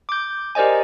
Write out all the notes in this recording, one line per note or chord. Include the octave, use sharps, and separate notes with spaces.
D6 G6
G4 A#4 C5 D5 D#5 G#5